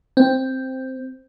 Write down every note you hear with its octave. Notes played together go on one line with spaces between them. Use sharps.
C4